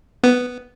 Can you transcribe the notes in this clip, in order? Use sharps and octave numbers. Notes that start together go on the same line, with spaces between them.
B3